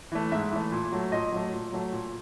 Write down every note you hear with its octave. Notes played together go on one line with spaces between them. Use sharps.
E3 A3
G#2 E5
E3 A3
A#2
F#3 A3
A#2 D#5
F#3 A3
A#2
F#3 A3
A#2